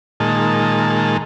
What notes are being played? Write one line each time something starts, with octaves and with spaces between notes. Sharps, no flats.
A#2 D#3 G#3 A5